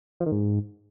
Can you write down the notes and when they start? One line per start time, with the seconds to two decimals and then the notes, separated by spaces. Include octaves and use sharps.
0.20 F3
0.26 D#3
0.32 G#2